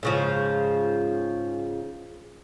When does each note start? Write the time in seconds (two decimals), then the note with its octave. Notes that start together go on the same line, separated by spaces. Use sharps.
0.03 G#2 C#3 F3